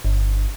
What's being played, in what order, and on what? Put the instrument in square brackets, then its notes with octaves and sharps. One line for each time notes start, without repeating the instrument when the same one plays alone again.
[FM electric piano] G1